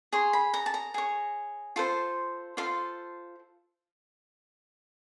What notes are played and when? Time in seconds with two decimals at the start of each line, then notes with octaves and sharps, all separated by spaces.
0.13 G#4 C#5 C6
0.33 B5
0.54 A#5
0.66 A5
0.74 A#5
0.94 G#4 C#5
1.76 F4 A4 C5
2.57 F4 A4 C5 F5